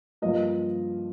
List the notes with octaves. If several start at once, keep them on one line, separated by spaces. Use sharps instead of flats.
G2 F3 A#3 D#5